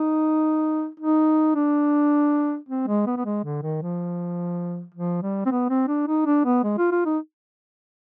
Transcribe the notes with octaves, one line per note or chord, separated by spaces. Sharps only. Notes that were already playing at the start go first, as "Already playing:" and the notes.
Already playing: D#4
D#4
D4
C4
G#3
B3
B3
G#3
D3
D#3
F3
F3
G3
C4
B3
C4
D4
D#4
D4
B3
G#3
F4
F4
D#4